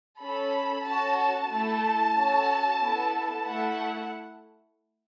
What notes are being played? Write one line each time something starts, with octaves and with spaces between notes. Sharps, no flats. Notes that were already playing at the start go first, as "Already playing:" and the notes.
C#4 A4 B5
C#4 F#4 A4 A5
A3 E4 A4 A5
C#4 F#4 A4
B3 E4 A4
A3 E4 A4 F#5